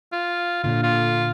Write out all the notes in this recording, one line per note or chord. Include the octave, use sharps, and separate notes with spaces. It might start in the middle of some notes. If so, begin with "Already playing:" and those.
F4
A#2 D3 F4
F4